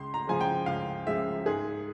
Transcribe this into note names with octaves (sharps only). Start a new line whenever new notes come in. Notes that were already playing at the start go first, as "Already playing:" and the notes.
Already playing: C#2 C6
A#5
C#3 F3 G#3 G#5
G5
C#2 F5
C#3 F3 G#3 E5
G#2 G#4